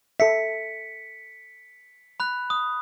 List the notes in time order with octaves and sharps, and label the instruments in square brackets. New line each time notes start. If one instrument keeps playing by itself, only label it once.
[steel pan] A4 E5 [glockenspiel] B6 C#7
[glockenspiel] B5 F#6
D#6